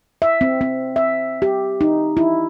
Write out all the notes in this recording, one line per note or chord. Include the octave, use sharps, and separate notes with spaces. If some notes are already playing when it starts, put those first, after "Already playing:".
E5
C4
C4
E5
G4
D#4
E4